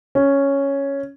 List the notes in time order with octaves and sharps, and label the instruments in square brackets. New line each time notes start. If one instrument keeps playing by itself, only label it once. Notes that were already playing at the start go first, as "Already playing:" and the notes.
[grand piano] C#4